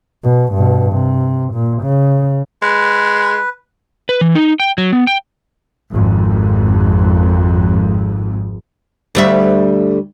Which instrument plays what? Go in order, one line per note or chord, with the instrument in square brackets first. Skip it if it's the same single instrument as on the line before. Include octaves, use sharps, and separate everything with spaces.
[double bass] B2
G2 B2
C3
A#2
C#3
[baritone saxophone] G#3 [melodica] B4
[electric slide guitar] B4
E3
D#4
G5
F#3
B3
G5
[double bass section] G#1 F2 G#2
[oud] D2 G3 E5